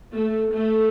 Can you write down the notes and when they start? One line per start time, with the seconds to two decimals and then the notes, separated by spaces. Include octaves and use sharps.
0.15 A3
0.52 A3